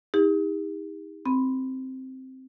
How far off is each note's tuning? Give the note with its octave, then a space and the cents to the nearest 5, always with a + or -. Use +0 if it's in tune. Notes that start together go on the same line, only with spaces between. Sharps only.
D#4 +40 G4 +45
C4 +0 B5 +0